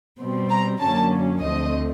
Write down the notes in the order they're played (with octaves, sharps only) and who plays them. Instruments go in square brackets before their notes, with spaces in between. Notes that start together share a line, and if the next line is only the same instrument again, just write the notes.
[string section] B2 G3 C4
A#5
F#2 D3 F#3 A#3 C#4 A5
D2 D3 F3 A3 C4 D#5